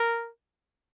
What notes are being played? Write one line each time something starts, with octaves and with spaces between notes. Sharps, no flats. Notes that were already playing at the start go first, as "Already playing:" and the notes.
Already playing: A#4